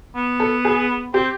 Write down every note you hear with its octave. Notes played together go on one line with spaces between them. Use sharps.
B3
A4
G#4
C4 G4